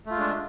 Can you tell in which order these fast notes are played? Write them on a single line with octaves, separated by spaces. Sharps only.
A3 F4 G#3 D4